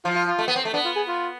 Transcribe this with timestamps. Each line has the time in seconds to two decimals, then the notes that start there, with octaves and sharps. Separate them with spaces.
0.05 F3 F4
0.16 F4
0.28 F4
0.39 A3
0.48 B3
0.56 C4
0.65 A3
0.73 B3 D4
0.85 F4
0.96 G#4
1.07 F4